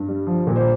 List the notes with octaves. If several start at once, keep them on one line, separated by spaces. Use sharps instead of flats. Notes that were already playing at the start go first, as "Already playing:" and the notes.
Already playing: G2
G3
F3
A#2
C5